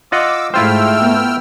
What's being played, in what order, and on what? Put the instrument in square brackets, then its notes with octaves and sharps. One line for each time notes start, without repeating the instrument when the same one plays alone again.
[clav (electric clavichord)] F4 D#5 F#5 [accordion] D6 E6
[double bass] G#2 [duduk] A3 [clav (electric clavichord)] E4 F4 C5 [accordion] G5 E6 F6
[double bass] B3